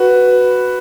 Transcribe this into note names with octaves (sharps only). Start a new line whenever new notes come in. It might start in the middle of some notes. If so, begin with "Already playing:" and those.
Already playing: F#4 B4